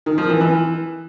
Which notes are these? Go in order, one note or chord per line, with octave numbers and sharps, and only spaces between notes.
D#3
F3
E3
E3